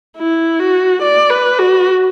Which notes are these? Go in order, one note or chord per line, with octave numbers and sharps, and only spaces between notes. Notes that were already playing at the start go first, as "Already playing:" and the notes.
E4
F#4
D5
B4
F#4